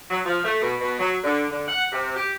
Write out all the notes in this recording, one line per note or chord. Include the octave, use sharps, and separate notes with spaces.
F#3
F3
A3
B2
B2
F#3
D3
D3
F#5
C3
G4